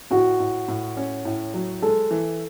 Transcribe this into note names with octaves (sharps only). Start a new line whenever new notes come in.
A2 F#4
A2
A2
C#4
A2
F#3
G#3 A4
E3